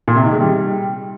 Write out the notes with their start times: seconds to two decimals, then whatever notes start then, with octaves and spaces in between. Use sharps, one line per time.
0.08 A#2
0.16 C3
0.24 D#3
0.32 G#3
0.40 G3